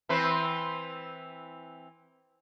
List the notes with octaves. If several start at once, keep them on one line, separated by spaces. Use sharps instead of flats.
E3 C4 B4